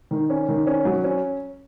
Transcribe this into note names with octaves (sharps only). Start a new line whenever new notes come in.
D#3
C#4
D#3
C#4
F#3
C#4